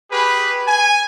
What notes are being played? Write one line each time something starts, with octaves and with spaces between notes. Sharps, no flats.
G4 G#4 B4
G#5